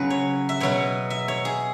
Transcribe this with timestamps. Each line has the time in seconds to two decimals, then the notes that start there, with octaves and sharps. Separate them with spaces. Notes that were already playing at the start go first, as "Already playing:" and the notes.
Already playing: C#3 F#3 C#4 G#4 B4
0.10 C#5
0.49 E5
0.60 B2 F#3 B3 C#5
1.10 E5
1.28 C#5
1.45 G#4